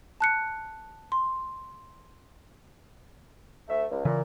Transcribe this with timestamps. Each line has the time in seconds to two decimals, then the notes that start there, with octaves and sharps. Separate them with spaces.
0.20 A5 F#6 C#7
1.12 C6
3.68 D2 A3 E5
3.91 C#2
4.05 A#2 C#3 E3